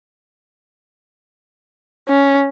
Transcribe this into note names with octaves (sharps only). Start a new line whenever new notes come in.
C#4